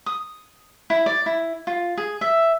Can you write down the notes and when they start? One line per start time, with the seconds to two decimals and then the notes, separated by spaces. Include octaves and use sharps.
0.06 D#6
0.90 E4
1.06 D5
1.26 E4
1.67 F4
1.97 G#4
2.21 E5